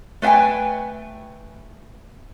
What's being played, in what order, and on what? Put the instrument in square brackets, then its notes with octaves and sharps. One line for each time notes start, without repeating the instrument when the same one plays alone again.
[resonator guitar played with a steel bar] A3 B4 E5 G5 G#5